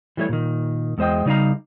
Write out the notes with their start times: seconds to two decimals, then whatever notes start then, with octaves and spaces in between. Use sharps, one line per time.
0.17 E3 G3 A3 E4 C#5
0.29 A#2 D#3
0.98 E2 G#3 C5 D#5 G5
1.26 C#3 G3 D#4 D5 F5 A#5